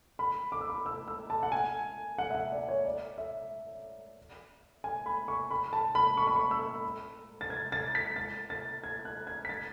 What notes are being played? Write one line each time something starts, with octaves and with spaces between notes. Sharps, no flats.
B5
D6
E6
D6
E6
E6
A5
F#5
G#5
F#5
E5
F#5
D5
C#5
D5
E5
G#5
B5
C#6
B5
A5
B5
C#6
B5
C#6
E6
A6
G#6
A6
B6
A6
A6
G#6
F#6
G#6
B6
A6